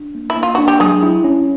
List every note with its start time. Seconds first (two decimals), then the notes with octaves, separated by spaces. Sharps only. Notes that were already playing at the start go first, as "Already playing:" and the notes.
Already playing: D4
0.15 A#3
0.30 E4
0.37 A#3
0.43 F4
0.55 D4 F#4
0.68 G4
0.80 F#3 G#3 G#4
1.03 E4
1.24 C#4